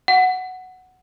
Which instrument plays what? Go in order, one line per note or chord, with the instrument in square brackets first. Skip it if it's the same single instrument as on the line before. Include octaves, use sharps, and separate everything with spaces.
[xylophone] F#5